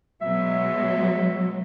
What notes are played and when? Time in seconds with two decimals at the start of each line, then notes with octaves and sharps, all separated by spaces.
0.21 B2 F#3 G#3 E5